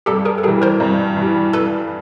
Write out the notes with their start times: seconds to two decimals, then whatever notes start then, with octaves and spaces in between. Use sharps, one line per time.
0.06 G2 G4 A4
0.25 G#4 A#4
0.38 A4
0.43 E3 G3 G#4 A#4
0.62 A#4 C5
0.80 G2
1.17 E3
1.22 G3
1.53 G2 A4 B4